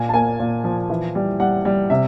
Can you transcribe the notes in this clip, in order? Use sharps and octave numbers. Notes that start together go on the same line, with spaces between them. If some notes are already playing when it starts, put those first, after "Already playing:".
Already playing: A#2 G#5
A5
A#3 G#5
A#2
F3
E3
G3
G3 F#5
G3
C3 E5